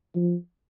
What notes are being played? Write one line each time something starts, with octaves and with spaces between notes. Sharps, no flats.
F3